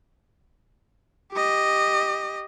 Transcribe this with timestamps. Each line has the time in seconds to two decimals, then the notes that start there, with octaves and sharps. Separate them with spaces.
1.33 G4 D#5